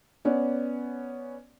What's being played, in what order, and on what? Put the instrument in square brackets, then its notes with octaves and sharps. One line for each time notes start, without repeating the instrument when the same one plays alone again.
[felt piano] B3 C#4 D5